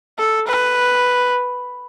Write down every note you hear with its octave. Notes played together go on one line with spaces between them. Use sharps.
A4
B4